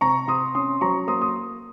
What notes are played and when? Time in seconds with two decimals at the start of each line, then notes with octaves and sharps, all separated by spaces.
0.01 C3 A#5 C#6
0.28 C3 C6 D#6
0.55 C#4 C6 D#6
0.81 F#3 A#5 C#6
1.07 A#3 C6 D#6
1.22 D#6